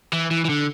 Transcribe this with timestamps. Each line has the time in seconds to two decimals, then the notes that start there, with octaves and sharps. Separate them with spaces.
0.13 E3
0.31 E3
0.45 E3
0.49 D3